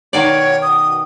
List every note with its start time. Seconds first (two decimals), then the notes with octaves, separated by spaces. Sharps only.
0.13 B2 D#3 C#5 D5
0.62 D#6